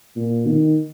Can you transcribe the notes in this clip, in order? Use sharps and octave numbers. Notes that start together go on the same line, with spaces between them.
A#2
D#3